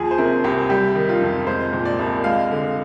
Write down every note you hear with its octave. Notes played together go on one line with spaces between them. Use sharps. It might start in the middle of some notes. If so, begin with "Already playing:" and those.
Already playing: D#2 F3 G#4
C5
C3 A#4
C2 G4
G3 G4
D#3
F4
F2
G#3 C5
A#2
D5
C2
G#3 F5
D3